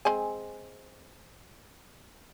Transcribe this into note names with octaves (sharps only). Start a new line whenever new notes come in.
G#3 C4 G#5